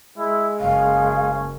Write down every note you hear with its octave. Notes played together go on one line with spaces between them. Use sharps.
G#3 E4
F#1 C#4 F5